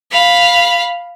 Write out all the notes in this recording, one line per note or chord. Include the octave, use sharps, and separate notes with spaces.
F5 B5